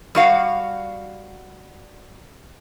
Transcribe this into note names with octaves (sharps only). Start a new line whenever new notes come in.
G3 F#4 F5 F#5